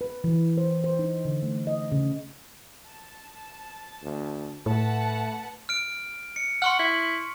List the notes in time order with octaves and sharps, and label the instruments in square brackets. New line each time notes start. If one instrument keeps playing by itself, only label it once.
[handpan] B4
E3
C5
C5
D#4
D3
A3
D#5
C#3
[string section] A5
[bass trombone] D2
[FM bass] A2 [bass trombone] A3 [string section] B4 F#5 A5
[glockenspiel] F6 D7
C#7
[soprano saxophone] F#5 [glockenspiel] C6 C#6 F6
[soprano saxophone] E4